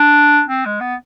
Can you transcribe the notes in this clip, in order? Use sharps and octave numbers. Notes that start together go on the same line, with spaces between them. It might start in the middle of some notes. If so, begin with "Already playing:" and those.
Already playing: D4
C4
G#3
B3